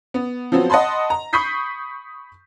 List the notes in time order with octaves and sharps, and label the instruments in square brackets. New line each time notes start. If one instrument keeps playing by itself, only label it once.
[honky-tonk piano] B3
F3 F#3 B3 C4
D#5 F#5 A5 B5 C6
A#5
B5 C#6 D#6 G6 B6 C7